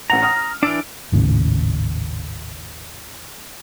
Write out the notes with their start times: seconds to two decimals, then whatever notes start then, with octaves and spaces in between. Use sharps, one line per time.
0.10 A1 F#5 A#5 F7
0.22 D#6 F6
0.63 E3 D4 E6 A6 D7
1.12 G#1 D#2 A2 C#3